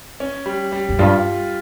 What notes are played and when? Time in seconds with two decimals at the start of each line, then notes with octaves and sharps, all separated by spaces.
0.20 C#4
0.46 G3
0.72 G3
0.89 F2
0.99 G2 F4